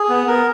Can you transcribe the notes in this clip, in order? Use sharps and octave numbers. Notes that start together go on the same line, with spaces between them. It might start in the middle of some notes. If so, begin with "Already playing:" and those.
Already playing: G#4
B3
B3 A#4